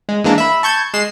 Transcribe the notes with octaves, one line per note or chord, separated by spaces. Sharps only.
G#3
E3 G#3 A#3 D4
E5 B5
A5 C#6 G6 G#6
G#3 C7 E7